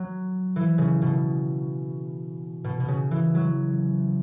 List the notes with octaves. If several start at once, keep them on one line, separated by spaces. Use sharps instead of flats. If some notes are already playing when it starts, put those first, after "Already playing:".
Already playing: F#3
E3
C#3
B2
B2
B2
C#3
E3
F#3